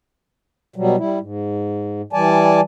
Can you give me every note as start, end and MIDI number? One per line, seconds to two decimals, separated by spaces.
0.76 0.96 47
0.76 0.96 54
0.76 0.96 55
0.98 1.19 55
0.98 1.19 64
1.20 2.02 44
2.13 2.60 52
2.13 2.60 55
2.13 2.60 74
2.13 2.60 80
2.13 2.60 81